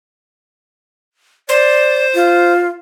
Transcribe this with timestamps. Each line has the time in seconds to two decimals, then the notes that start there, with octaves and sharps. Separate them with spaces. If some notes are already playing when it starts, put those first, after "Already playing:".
1.49 C5 D5
2.15 F4